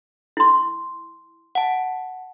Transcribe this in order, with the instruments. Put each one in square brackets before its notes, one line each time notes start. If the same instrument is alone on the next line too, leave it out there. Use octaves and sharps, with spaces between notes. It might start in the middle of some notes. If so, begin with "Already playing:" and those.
[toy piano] E4 C6
[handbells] F#5 A5